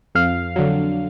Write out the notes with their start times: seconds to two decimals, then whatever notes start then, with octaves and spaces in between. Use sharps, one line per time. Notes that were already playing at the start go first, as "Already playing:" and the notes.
0.15 F2 F5
0.56 D3 F#3